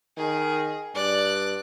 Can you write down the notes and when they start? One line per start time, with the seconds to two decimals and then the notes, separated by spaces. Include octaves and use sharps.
0.17 D#3 G#4
0.95 G2 D5 F#6